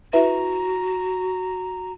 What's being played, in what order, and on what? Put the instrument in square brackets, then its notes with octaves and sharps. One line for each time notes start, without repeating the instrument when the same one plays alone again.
[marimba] E4 B4 E5 [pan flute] F#4 [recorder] A#5